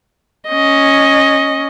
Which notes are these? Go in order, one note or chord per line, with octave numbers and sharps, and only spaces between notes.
C#4 D#5